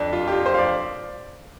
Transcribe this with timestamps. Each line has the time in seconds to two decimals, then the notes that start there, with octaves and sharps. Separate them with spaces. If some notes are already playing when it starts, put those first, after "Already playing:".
Already playing: F2 D4
0.12 F4
0.28 G4
0.32 F4
0.46 C5
0.54 F5
0.58 D5